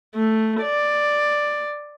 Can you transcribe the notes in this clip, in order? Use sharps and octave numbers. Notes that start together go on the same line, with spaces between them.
A3
D5